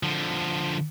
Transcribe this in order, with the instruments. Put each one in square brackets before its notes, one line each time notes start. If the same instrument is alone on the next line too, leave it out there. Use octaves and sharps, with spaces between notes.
[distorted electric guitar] D3 F3